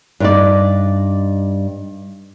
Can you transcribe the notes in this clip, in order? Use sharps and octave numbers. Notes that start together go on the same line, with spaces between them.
G2 D#4 D5